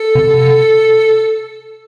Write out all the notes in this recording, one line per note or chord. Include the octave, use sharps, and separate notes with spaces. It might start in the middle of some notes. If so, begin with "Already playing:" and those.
Already playing: A4
C3